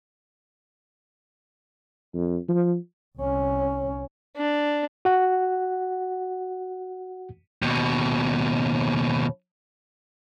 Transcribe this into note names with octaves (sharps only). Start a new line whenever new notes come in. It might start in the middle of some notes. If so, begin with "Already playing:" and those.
F2
F3
C2 C#4
D4
F#4 F#5
D#2 B2